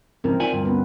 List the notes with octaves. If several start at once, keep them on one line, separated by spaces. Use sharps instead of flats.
F2 G#2 C#3 C4 E4 A#4
D#4 F4 D5 G#5
D2 G2
B3 C#4 B4